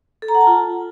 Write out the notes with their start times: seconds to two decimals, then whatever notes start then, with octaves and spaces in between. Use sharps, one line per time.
0.22 A4
0.28 A#5
0.35 F#5
0.41 A5
0.47 F4